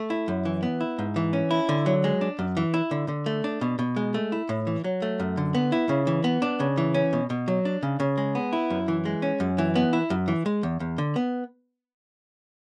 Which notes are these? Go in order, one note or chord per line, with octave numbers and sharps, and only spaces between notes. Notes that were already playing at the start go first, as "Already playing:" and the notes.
Already playing: A3
E4
F#2
E3
B3
E4
G#2
E3
C#4
E4
D3
F#3
G#3
D4
F#2
E3
E4
D3
D3
A3
D4
B2
B2
G#3
A3
E4
A2
E3
F#3
A3
F#2
D3
B3
E4
C#3
E3
B3
D4
C#3
E3
C#4
B2
B2
F#3
D4
C#3
C#3
G#3
B3
E4
F#2
E3
G#3
C#4
F#2
E3
B3
E4
F#2
E3
G#3
E2
E2
D3
B3